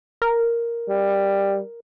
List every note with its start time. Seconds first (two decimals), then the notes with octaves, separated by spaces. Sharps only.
0.22 A#4
0.89 G3